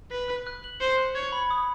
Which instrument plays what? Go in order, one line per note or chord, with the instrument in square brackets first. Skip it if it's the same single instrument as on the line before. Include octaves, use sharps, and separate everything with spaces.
[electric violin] B4 [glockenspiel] B6
[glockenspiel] F#6
F#6
F#7
[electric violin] C5 [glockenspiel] C#7
[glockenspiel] F#6
[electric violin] C#5 [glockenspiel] G#6
[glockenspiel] B5
D#6